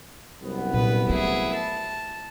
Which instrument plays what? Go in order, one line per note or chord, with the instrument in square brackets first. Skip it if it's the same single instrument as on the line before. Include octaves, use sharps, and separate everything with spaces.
[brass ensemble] C2 F#2 B3
[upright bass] A#2 [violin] B4
[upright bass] A3 [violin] E4 G#4
[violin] A5